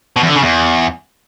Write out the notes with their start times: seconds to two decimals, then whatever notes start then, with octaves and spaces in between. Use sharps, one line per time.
0.16 B2
0.23 E2
0.29 D3
0.35 C#3
0.42 E2